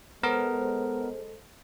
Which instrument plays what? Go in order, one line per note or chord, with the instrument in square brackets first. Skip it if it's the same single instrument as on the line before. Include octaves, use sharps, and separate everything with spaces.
[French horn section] G#3 A4 C5 [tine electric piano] B3 A#4